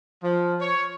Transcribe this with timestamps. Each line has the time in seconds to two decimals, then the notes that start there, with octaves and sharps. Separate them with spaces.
0.23 F3
0.61 C#5